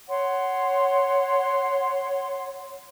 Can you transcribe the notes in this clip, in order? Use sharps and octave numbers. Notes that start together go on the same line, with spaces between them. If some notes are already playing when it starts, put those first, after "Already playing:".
C#5 F#5 C6